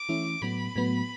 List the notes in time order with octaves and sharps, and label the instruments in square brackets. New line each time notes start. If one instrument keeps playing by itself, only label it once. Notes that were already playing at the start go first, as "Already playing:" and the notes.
Already playing: [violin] D6
[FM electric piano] E3 A3 C#4 E4
[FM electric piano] A2 F#3 B3 [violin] B5
[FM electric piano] A2 F#3 B3